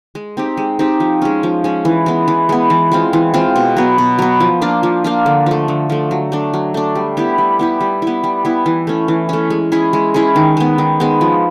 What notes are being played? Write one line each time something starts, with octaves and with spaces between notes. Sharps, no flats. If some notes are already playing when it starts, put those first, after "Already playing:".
G#3
C4 D#4 G4
G#3
C4 D#4 G4
F3
G#3 C#4
F3
G#3 C#4
E3
G#3 B3
E3
G#3 B3
E3
G#3 C4 F4
E3
G#3 C4 F4
B2
F#3 B3
B2
F#3 B3
F3
A#3 D4 F4
F3
A#3 D4 F4
D3
F3 A3
D3
F3 A3
F#3
A3 D4
F#3
A3 D4
G3
B3 E4 G4
G3
B3 E4 G4
G3
B3 E4
G3
B3 E4
E3
A3 C#4
E3
A3 C#4
G#3
C#4 E4 G#4
G#3
C#4 E4 G#4
D#3
G#3 B3
D#3
G#3 B3
F3